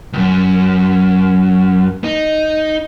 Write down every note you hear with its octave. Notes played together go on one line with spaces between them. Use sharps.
C#2 F#2
D#4